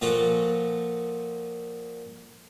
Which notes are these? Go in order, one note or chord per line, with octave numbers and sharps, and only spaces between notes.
A#2 F3 F4 F#4 A4